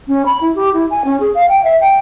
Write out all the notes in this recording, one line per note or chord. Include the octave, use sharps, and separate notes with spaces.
C#4
B5
E4
G4
E4
G#5
C#4
G#4
F5
G5
E5
G5